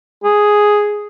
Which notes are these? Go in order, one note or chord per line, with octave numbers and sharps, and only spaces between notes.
G#4